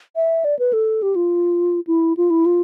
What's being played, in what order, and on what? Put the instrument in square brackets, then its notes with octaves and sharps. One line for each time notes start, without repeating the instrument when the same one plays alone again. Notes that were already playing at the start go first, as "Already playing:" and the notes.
[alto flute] E5
D5
B4
A4
G4
F4
E4
F4
E4
F4